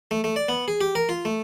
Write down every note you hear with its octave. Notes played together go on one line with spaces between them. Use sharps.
A3
A3
D5
B3
G#4
G4
A#4
F4
A3